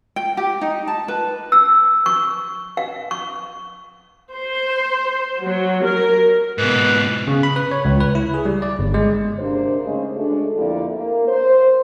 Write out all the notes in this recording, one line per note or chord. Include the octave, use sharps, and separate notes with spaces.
G5
G4
D#4
A5
B4
E6
C#6
F5
C#6
C5
F#3
A#4
G#2 B2 B4
C#3
B5
B4
C#5
C#2
B4
E4
G#4
G3
D5
G1
G#3
C3 A#3 D4 G#4 C5
C#3 G#3 A3 D#4 G#4
G#3 A3 D4 F#4 G#4 A4
F2 D3 A#3 E4 G4 D5
A#3
C5